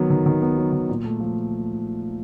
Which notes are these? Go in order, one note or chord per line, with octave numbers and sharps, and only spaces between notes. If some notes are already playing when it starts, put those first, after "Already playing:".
Already playing: D#3 F#3 B3
D#3
D#3
B3
F#3
D#3
A#2
A3
F3